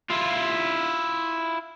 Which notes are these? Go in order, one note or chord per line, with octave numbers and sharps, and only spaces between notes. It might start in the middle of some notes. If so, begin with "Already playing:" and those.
E4 F4